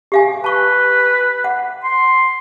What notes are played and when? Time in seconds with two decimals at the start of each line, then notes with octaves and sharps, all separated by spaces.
0.12 G4 F5 G#5
0.44 B4 A5 C#6
1.44 F#5
1.83 C6